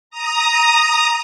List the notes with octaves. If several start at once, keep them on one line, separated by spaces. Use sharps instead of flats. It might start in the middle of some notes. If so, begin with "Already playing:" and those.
A#5 D#6